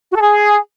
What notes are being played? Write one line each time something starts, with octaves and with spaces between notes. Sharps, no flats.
F#4
A4
G#4